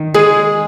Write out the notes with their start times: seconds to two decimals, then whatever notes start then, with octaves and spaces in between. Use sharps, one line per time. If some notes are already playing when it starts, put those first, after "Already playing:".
Already playing: D#3
0.14 G#3 G#4